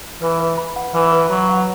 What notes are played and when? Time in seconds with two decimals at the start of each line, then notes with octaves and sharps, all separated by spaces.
0.22 E3 B4
0.40 B4
0.58 B5
0.76 F#5
0.94 E3 B4
1.12 B4
1.30 F#3 B5
1.49 F#5